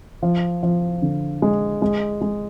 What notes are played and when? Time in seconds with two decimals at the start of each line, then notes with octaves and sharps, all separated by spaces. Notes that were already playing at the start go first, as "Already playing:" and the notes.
0.22 F3
0.63 F3
1.02 D3
1.42 G#3
1.82 G#3
2.21 G#3